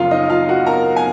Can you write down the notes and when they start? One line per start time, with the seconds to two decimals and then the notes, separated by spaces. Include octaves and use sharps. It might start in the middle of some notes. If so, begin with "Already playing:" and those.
Already playing: F#2 C#3 F3 F4 F5
0.11 D#4 D#5
0.30 F4 F5
0.49 F#4 F#5
0.66 A#4 A#5
0.96 G#5